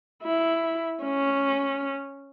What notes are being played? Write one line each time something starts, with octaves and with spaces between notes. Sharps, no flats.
E4
C#4